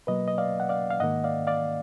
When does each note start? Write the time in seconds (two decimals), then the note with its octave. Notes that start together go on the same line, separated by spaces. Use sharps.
0.07 B2 F#3 A#3 B4 D#5
0.28 D#5
0.38 D5 F5
0.60 F#5
0.69 D5 F5
0.90 F5
1.00 G#2 D#3 A#3 D#5 F#5
1.24 D5 F5
1.47 D5 F5